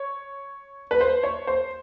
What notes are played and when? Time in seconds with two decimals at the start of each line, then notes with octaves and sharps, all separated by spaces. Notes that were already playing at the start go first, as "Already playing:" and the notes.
Already playing: C#5
0.91 B4
1.01 C5
1.23 C#5
1.47 C5